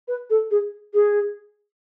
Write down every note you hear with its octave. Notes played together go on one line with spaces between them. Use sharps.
B4
A4
G#4
G#4